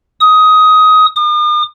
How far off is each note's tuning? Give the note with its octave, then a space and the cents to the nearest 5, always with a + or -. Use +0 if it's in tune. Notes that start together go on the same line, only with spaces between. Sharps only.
D#6 +15
D#6 -45